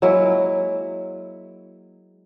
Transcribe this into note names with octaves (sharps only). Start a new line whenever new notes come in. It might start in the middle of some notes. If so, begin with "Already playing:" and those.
F#3 G#3 A#3 E4